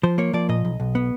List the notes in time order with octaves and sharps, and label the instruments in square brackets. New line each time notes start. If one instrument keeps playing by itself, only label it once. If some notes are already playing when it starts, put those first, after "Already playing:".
[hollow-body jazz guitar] F3 C5
A#3 C#5
F3 D5
A#2 D#5
B1
B1
B3